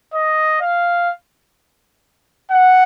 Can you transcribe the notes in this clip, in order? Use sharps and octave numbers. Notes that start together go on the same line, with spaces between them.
D#5
F5
F#5